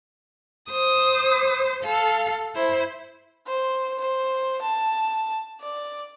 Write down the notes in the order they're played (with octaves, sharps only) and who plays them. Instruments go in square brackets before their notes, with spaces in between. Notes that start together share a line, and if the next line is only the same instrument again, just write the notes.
[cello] C5 [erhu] D#6
[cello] A4 [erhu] F5
[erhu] E4 [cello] C5
[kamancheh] C5
C5
A5
D5